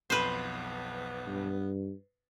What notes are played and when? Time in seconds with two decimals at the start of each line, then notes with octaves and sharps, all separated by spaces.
0.10 B1 F2 B3 B4 C5 C7
1.27 G2